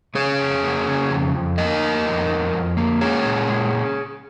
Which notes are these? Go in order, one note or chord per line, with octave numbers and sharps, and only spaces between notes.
C#3 G#4 C#5
F2
A#3
C#3
F2
F2
A#3 A#4 D#5
F2
F2
F2
F2
A#3
G#3 G#4 C#5
A#2
G#3